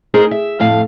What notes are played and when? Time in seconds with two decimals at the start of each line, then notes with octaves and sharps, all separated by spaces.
0.14 D#4 G#4 A#4 C5
0.31 E5
0.60 F2 A2 F5